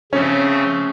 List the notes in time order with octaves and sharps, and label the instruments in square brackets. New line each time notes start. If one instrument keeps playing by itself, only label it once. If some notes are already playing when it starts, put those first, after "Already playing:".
[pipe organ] C#3 F3 A3 C4 [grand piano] C#4